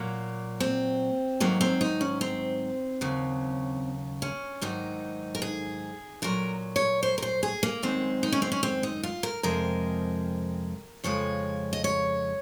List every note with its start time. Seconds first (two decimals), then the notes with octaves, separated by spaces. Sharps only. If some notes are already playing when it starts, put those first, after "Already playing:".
Already playing: A#2 F#3 A#3
0.60 C4
1.40 G#2 D#3 F#3 A#3
1.61 C4
1.81 D#4
2.01 C#4
2.21 C4
3.01 D#2 C#3 F#3
4.22 C#4
4.61 G#2 D#3 F#3 D#4
5.35 A#4
5.42 G#4
6.22 A#2 F#3 A#4
6.76 C#5
7.03 C5
7.18 A#4
7.22 C5
7.43 G#4
7.63 A#3
7.82 F#2 D#3 G#3 C4
8.23 D#4
8.32 C#4
8.42 C4
8.52 C#4
8.63 C4
8.83 D#4
9.03 F4
9.23 A#4
9.43 F2 C3 F3 G#3 A#4
11.04 F2 C#3 F3 G#3 C#5
11.73 D#5
11.84 C#5